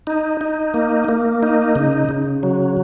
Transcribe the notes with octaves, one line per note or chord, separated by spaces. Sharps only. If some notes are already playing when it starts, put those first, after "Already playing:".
D#4
D#4
A#3
A#3
D#4
C#3
C#3
F#3